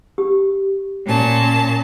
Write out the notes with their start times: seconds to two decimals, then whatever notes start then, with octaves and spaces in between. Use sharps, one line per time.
0.18 G4
1.06 A#2 C#4 A5